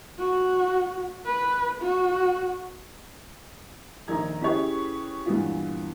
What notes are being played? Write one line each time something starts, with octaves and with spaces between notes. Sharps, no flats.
F#4
B4
F#4
A#1 D#3 A#5 G#6
C#4 E4 G4 G#4 B4 C#5
G2 A#2 E3 B3 F4